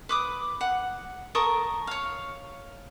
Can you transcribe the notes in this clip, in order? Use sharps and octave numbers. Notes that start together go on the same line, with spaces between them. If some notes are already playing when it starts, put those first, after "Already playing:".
B4 D6 D#6
F#5
A4 A#4 C#6 D#6
C#5 F5